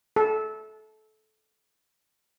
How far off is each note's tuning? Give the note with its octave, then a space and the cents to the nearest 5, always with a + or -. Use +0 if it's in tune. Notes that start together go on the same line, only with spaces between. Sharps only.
A4 -20